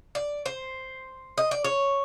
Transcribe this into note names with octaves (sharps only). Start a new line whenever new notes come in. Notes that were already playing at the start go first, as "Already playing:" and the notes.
D5
C5
D#5
D5
C#5